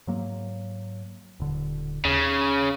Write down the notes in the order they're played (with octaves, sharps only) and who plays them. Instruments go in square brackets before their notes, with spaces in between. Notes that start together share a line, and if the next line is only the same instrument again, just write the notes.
[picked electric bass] G#2 F#3 A#3
D#1 D3
[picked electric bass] D#2 [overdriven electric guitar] C#3